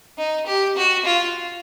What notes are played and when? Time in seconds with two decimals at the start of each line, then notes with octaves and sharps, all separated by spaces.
0.18 D#4
0.47 G4
0.77 F#4
1.05 F4